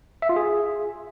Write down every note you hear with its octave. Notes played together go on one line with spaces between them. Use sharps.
E5
F4
G#4